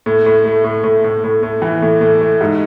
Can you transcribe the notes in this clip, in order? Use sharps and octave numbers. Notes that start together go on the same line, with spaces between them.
A2
A2
A3
A2
A2
A2
A2
A2
E3
A2
A2
A3
G#2